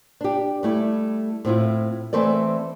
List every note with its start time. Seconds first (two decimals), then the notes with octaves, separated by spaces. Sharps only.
0.21 D4 G4
0.63 G3 A3 E4
1.45 A2 C4 E4 F4
2.13 E3 A3 C4 A4 D5